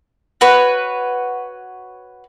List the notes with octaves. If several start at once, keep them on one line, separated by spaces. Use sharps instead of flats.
F#4 B4 C#5